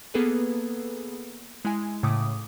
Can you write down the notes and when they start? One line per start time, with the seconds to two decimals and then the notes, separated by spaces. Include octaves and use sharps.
0.14 A#3 B3 G#4 A4 B4
1.65 G#3 E4 G#5
2.03 A2 C#3 A3 D6 D#6